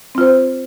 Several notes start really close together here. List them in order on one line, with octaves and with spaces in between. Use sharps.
C4 F4 C5